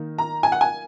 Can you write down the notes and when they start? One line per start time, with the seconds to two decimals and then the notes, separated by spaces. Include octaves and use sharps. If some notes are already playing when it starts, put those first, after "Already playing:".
Already playing: D#3 A#3 D#4
0.18 A#5
0.43 G#5
0.52 F#5
0.61 G#5